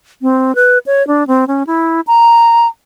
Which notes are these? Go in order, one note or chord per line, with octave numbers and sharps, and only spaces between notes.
C4
B4
C#5
D4
C4
C#4
E4
A#5